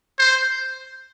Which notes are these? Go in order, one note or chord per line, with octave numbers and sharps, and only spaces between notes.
C5